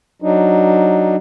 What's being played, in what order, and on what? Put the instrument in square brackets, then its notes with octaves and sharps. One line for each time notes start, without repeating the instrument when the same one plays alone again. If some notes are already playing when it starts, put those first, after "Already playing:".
[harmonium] F#3 D4 D#4